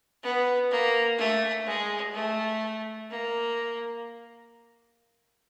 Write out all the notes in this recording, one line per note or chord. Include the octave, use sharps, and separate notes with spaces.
B3
A#3
A3
G#3
A3
A#3